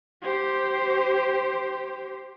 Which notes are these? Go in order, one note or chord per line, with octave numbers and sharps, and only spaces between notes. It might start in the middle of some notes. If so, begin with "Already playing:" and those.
G4 C5